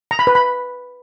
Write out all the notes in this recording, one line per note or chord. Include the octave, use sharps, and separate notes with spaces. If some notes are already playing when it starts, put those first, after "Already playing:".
A#5
B5
B4
B5